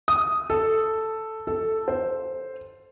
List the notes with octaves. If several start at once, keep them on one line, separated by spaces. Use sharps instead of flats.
D#6
A4
A4
C5